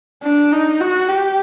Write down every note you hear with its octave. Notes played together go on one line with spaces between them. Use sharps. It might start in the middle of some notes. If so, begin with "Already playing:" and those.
D4
D#4
F#4
G4